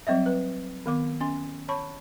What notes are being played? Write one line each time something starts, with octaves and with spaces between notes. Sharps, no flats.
F#3 G3 C4 D#5 E5
B4
D#3 B3 D6
C#4 C6
C#5 A5 B5 C#6